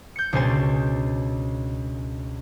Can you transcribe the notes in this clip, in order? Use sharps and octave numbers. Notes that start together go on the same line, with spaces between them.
G6 C#7
C#2 B2 D4 C5 G#5 A6